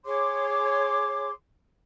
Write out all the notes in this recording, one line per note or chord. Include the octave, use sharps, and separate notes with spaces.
G#4 C#5 C6 D6